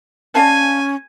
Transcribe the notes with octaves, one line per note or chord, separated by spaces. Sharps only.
C#4 D5 F5 G#5 A5